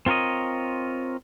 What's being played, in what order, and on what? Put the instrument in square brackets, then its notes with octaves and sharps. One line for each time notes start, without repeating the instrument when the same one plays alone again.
[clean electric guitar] C4 F4 A#4 C#5 D#5